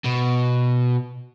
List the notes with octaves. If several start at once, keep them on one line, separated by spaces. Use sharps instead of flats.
B2